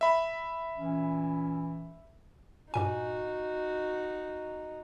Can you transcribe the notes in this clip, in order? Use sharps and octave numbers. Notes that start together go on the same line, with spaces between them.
E5 B5
A#2 E3 C#4
G2 A#2 D#4 F#4 G#5